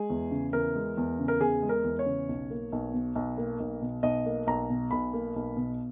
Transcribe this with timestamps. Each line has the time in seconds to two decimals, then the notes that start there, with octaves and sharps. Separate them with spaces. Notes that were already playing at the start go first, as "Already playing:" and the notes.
Already playing: G#3 G#4
0.10 E2
0.31 C#3
0.53 E2 A#4
0.75 G#3
0.97 E2
1.19 C#3
1.28 A#4
1.41 E2 G#4
1.62 G#3
1.69 A#4
1.84 E2
1.99 C#5
2.06 C#3
2.29 B1
2.50 A#3
2.72 B1
2.93 B2
3.15 B1
3.38 A#3
3.60 B1
3.81 B2
4.03 B1 D#5
4.26 A#3
4.47 B1 A#5
4.70 B2
4.91 B1 B5
5.13 A#3
5.36 B1
5.57 B2